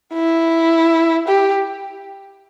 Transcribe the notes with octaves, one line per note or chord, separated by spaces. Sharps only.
E4
G4